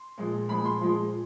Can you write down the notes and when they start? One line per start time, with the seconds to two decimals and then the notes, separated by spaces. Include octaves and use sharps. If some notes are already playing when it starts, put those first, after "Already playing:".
Already playing: C6
0.18 A#2 F3 G#3
0.49 A#2 F3 G#3 B5
0.65 C6
0.80 A#2 F3 G#3